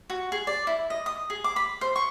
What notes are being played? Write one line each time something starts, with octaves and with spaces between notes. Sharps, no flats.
F#4
G#4
D5
E4
D#5
D#6
G#4
D6
B5
C5
C#6